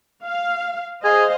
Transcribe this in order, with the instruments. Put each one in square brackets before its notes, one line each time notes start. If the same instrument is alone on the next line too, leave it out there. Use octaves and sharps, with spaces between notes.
[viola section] F5
[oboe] G#4 [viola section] C5 D#5 F5